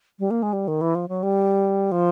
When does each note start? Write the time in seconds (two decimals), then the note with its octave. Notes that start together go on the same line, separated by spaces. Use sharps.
0.19 G3
0.31 A#3
0.43 G#3
0.53 G3
0.68 D#3
0.81 E3
0.95 F3
1.09 F#3
1.23 G3
1.92 F3